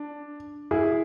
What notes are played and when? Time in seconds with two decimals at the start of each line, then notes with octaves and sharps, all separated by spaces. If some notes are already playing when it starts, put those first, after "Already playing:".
Already playing: D4
0.71 E4 G#4